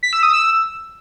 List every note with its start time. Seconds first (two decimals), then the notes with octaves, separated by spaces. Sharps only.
0.03 B6
0.13 E6
0.23 D#6
0.33 E6